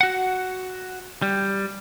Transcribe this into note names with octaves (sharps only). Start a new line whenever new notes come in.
F#4 F#5
G3